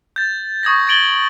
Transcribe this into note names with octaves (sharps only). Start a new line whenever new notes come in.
G6 A6
C#6 D#6 G#6 A#6
G#6 A6 D7 F#7 G7